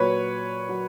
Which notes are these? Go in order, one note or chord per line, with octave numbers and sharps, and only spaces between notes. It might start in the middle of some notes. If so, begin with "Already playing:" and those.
Already playing: A#2 F#3 B4 C#5
F#3